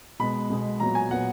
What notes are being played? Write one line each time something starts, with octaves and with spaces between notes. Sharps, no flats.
B2 G#3 B3 B5
B2 G#3 B3
A#2 F#3 B3 A#5
G#5
A#2 F#3 B3 F#5